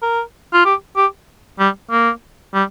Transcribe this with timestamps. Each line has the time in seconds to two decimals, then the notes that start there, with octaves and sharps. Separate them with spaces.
0.02 A#4
0.54 F4
0.65 G4
0.97 G4
1.59 G3
1.91 A#3
2.54 G3